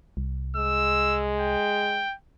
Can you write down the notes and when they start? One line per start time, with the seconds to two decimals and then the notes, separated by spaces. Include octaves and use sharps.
0.17 C2
0.56 G#3 E6
1.40 G5